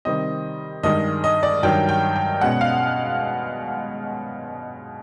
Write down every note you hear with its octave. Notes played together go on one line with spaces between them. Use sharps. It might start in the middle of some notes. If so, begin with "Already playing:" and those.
C3 D#3 G3 C4 D#5
G2 D#3 G#3 D#5
D#5
D5
G2 D#3 F#3 G5
G5
G5
B2 G#3 C#4 F#5
F5